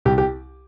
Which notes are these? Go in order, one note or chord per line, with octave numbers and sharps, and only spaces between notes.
C2 G4
G4